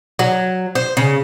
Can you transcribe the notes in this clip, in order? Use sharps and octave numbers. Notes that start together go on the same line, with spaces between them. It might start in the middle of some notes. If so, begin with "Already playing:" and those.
F#3
C5
C#3